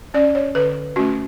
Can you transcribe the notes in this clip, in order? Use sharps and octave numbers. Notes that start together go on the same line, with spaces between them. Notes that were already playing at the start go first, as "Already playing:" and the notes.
C#4 D5
C#5
D3 B4
A3 C#4 F#4